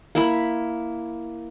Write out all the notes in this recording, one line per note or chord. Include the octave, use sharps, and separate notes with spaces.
A#3 E4 B5